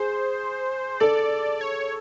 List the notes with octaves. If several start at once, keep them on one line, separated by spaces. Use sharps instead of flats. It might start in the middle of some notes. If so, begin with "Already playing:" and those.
Already playing: G#4 C5
A4 D5
C#5